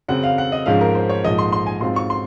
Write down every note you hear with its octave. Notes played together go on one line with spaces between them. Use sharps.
F#2 C#3 F#3 C4 F#5
F5
F#5
D#5
G#2 F3 G#3 C#4 F5
A#4
C5
C#5
A#1 G#2 F3 D#5
C6
C6
G#5
G#2 F#3 C4 F4 C6
C#6
C6